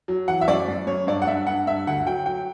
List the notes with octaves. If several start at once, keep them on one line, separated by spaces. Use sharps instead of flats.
F#3
E3 F#5
E5
F#2 D5
F#2
F#2 C#5
G2 D5
F#5
G2 E5
G2 F#5
G2 E5
D2 F#5
F#3 G5
F#3 G5